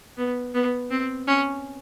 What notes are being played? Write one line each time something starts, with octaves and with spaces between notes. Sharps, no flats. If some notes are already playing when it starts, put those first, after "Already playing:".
B3
B3
C4
C#4